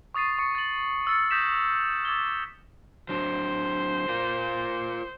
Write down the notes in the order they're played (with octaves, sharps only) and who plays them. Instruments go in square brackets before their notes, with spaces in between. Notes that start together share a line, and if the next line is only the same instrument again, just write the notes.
[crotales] C#6 D#6 A6 C7 D#7
C#6 D#6 C#7
A6 F#7
E6 F6 A6 C#7
D#6 G6 A#6 B6 E7
D6 E6 G#6 A6 G7
[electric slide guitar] F#3 D4 [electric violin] C5
[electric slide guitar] F4 A#4 F5